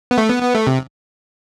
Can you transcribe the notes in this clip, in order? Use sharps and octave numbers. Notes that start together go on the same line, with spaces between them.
B3
A3
B3
B3
A3
C3